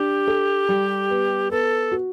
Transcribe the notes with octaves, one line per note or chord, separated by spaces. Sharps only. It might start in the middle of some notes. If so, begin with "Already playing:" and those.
Already playing: D4 G4
A4
G3
B3
B3 A4
F#4